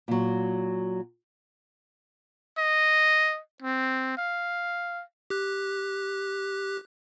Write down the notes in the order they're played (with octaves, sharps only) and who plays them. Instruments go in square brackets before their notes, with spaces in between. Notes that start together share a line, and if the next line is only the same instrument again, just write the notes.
[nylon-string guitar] A#2 F#3
[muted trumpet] D#5
C4
F5
[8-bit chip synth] G4 F#6